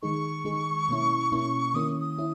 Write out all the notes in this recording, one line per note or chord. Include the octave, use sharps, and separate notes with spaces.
D#3 G#3 D#4 G#4 C#6
D#3 G#3 D#4 G#4
B2 A#3 C#4 E4
B2 A#3 C#4 E4
D#3 A#3 C#4 E4 D#6
D#6
C#4 E4